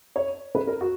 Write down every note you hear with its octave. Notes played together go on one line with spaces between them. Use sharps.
C#5
B4
A#4
F#4